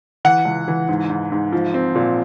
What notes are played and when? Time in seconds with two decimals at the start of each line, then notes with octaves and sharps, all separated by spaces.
0.25 E3 F#5
0.45 C#2
0.68 E3
0.89 G#2
1.10 G#2
1.32 G#2
1.52 F3
1.74 C4
1.95 A#2